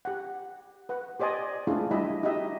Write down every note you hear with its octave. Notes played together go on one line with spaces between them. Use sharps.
G4 F#5
B4 F#5
G4 C5 D5 D#5 G#5
G#3 A3 D4 E4 F4 G#4
G3 E4 G4 D#5 E5 B5
D#4 F#4 G4 D#5 E5